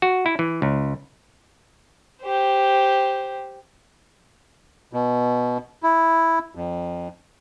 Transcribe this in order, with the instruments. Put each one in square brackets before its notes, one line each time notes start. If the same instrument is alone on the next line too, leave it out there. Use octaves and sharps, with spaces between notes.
[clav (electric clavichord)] F#4
E4
E3
C#2
[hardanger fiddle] G4 C5
[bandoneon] B2
E4
F2